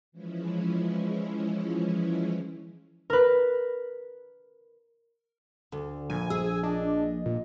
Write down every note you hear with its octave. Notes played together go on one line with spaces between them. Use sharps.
E3 F3 G#3 C#4 E4
A#4 B4
D2 D3
A#1 G#5
G#4 E6
D4 D#5
A#2